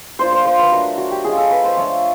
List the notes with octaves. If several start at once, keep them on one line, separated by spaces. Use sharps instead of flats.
A#3 D4 F4 C5
C5
C5
B4
F#3 A3 D4 A#4
F#4
G4
G#3 C#4 F4 G#4
A4
B4
C5
F3 A3 D4 C#5